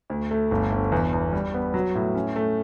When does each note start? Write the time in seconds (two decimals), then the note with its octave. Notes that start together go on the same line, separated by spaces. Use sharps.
0.10 D2
0.31 A3
0.51 G1
0.72 G1
0.92 E2
1.13 E2
1.33 G3
1.54 B3
1.74 F#3
1.95 A2
2.15 C#4
2.36 A3